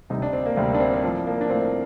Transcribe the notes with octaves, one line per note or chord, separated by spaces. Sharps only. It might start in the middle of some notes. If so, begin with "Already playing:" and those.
D2 C3 G3 D#4
D4
C4
A#3
D2 C3 G3 A#3
D4
C4
C4
A2 F3 D4
A#3
D4
A2 F3 C4